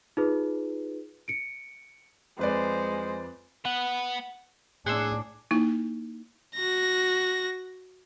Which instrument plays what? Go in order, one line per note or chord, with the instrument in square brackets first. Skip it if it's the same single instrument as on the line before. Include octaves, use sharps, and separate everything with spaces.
[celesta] D#4 F4 G#4 B4
C#7 D7
[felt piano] F2 B4 D5 [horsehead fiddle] G#3 C5
[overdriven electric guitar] B3 F#5
[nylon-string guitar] A2 [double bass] D4 [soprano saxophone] G#4 [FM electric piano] F#5 C6 E6
[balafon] A#3 D#4 E4
[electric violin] F#4 A#6